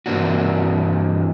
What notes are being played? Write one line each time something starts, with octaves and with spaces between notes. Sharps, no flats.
G2 E3 A#3 C4 D4 F#4